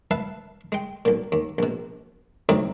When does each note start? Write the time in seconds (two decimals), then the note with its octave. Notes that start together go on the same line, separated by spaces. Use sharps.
0.11 B4 E5 F5 A5
0.72 G#3 G5
1.05 B1 A#2
1.32 D#2
1.58 A#1 B2
2.49 D2 A2 C3 F#3 D#4 D5